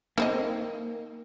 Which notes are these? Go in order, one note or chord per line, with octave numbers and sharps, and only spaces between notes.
D#3 A#3 C4 D#5